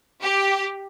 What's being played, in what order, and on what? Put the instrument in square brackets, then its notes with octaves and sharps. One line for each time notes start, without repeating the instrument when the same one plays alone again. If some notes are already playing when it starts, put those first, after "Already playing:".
[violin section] G4